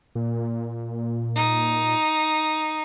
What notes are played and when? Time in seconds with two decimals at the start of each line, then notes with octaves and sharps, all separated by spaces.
0.15 A#2
1.35 D#4